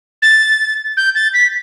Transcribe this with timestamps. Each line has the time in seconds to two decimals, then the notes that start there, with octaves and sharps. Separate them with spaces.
0.22 A6
0.97 G6
1.15 A6
1.34 B6